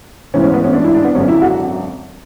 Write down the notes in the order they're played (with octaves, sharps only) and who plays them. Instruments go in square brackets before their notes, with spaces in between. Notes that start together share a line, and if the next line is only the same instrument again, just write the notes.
[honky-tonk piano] A1 G#2 E3 C#4
C#4
B3
C#4
D4
E4
D4
B3
G#1 F#2 D3 C#4
E4
F#4